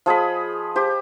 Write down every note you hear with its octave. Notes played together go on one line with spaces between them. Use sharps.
F3 G#4 D#5 B5
G4 C5